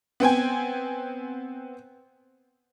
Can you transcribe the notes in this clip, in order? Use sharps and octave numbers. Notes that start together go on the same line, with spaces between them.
B3 C4 G5 G#5